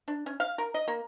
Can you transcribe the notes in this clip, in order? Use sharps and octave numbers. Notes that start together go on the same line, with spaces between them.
D4
C#4
F5
A#4
D#5
A#3